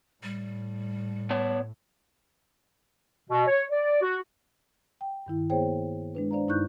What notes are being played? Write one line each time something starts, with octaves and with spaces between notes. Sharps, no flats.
A2 G3
B3 C#5 A5
B2
C#5
D5
F#4
G5
G2 D#3 E4
A#3 B3 G#4 C5 C#5 G5
G#3 D4 B4
D4 C5 D5 F5 A#5
G2 D#4 E4 C#6 F#6 G6